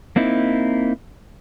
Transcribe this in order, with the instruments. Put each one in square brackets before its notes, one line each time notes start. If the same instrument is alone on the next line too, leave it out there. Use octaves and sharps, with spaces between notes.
[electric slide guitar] A#3 C4 D#4 E4